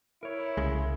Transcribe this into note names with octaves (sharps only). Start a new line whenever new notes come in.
E4 A#4 C#5
C2 C#3 G#3